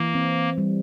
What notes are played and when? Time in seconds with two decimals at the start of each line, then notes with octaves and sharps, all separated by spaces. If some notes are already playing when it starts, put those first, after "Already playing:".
Already playing: E3 A#3
0.15 C4
0.58 G3